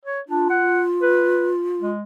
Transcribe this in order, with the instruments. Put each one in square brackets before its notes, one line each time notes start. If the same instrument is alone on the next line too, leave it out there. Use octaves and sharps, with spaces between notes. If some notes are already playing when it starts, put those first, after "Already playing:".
[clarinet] C#5
[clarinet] D4 [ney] F4
[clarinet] F#5
B4
G#3